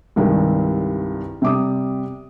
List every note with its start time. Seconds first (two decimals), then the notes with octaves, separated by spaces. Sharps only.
0.16 C2 G2 D#3 G#3
1.42 C3 G3 D6 D#6